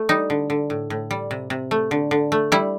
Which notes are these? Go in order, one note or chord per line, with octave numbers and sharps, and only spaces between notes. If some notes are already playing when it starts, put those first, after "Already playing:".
Already playing: A3
G3 D#4
D3
D3
A2
A2
G3
C3
C3
A3
D3
D3
A3
G3 E4